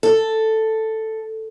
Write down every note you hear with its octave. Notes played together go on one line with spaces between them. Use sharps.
A4